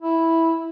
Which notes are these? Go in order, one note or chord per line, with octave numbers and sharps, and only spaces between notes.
E4